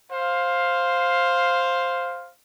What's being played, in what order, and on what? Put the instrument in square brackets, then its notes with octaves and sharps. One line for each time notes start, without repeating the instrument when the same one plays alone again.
[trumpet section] C5 F5